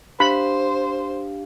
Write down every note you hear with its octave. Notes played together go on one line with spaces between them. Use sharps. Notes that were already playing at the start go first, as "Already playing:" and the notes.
D4 G4 C5 F5 B5